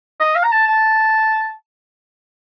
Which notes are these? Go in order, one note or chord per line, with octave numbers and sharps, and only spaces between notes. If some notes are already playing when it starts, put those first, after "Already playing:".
D#5
F5
A#5
A5
A5